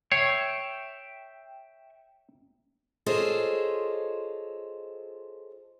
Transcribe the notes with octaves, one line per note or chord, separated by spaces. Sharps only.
C#5 E5 G5 C#6 C7
F4 G#4 A4 C5 C#5 D#5